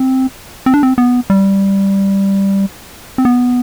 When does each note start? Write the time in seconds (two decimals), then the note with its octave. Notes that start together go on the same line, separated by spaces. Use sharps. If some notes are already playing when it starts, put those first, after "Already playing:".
Already playing: C4
0.66 C4
0.74 D4
0.83 C4
0.98 B3
1.30 G3
3.18 C4
3.25 B3